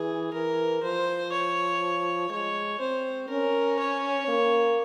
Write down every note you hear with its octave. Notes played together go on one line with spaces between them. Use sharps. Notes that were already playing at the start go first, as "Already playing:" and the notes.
Already playing: E3 G#4
E3 A#4
F3 C5
C#5
G#3 C#5
C4 C5
C#4 A#4
C#5
A#3